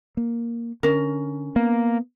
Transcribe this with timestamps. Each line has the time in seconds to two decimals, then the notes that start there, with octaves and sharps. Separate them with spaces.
0.17 A#3
0.83 D3 C#4 A#4
1.56 A#3 B3